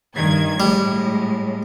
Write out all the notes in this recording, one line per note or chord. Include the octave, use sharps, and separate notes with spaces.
G2 D#3 G#6
A2 G3 G#3